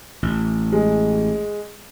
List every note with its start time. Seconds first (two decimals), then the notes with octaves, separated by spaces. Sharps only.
0.23 A1
0.72 G#3